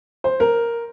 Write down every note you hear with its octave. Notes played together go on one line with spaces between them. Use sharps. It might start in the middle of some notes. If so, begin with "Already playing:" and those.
C5
A#4